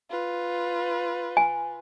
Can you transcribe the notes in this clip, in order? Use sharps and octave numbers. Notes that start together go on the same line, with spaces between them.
F4 B4
G#5